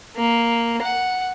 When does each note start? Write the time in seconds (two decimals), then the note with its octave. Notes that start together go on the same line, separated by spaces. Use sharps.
0.17 A#3
0.82 F#5